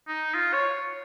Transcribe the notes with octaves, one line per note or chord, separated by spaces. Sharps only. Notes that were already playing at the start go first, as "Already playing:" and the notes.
D#4
F4
C#5